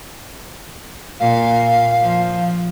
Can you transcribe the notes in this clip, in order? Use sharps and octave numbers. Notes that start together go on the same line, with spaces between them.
A#2 F5
F3